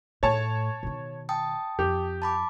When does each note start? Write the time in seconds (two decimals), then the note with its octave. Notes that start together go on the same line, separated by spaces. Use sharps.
0.23 A2 C#5 A5
0.83 B2 D#3
1.29 G5 A5 D#6
1.79 F2 G4
2.22 A5 B5 D6